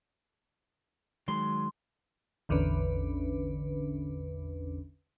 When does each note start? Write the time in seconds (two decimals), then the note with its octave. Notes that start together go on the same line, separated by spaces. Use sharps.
1.28 D#3 F#3 G#3 C6
2.49 A1 E2 D3 C#4 D4 B4